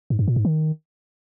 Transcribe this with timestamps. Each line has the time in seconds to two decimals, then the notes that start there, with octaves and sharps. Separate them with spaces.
0.10 G#2
0.19 G2
0.28 A#2
0.36 G#2
0.45 D#3